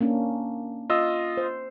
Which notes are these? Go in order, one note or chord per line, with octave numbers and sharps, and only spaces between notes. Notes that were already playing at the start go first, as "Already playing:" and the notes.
A#3 C#4 D4
F4 D#5 E6
C5